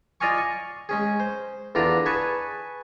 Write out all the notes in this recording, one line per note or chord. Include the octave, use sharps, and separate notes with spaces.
F4 D5 D#5 F5 G#5 C#6
C#6
G#3 C#4 G#4
C5
E2 D3 D4 F4 A#5
G#4 B4 G#5 A5 C#6